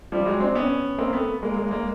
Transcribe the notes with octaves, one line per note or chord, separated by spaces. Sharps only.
F3 G3
F#3 G#3
C4 D4
B3 C#4
A#3 C4
A3 B3
G#3 A#3
G#3 A#3
G#3 A#3